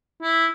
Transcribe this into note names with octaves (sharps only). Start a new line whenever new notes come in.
E4